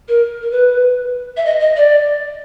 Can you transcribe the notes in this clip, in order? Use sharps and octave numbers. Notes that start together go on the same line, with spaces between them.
A#4
A#4
B4
E5
D#5
D#5
D5